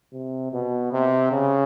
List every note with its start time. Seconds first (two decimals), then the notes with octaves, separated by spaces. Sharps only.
0.13 C3
0.52 B2
0.92 C3
1.32 C#3